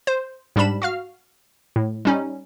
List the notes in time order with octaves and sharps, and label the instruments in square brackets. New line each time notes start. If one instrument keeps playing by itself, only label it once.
[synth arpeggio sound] C5
G#2 G3 D4 B5 E7
F#4 F5 F6
A2
G3 C#4 D#4